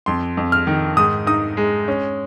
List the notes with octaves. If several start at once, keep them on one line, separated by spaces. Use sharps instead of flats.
F2 C6
F2
F6
D#3
G#2 D#6
D#4 D#6
G#3
C#4